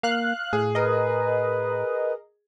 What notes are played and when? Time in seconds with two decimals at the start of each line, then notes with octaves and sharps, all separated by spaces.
0.03 A#3 F5 F#6
0.53 A2 G#4
0.75 A#4 B4 D#5